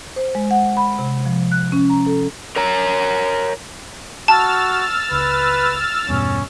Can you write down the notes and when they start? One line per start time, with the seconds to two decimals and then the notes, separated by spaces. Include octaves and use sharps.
0.16 C5
0.35 G#3
0.51 F#5
0.77 B5
0.99 C3
1.26 F3
1.52 F#6
1.72 C#4
1.90 A#5
2.06 A4
2.56 A#4 C#5 A#5
4.28 F#4 A5 E6 F6 A6
5.11 C#2 B4
6.08 E2 G2 B2 C#4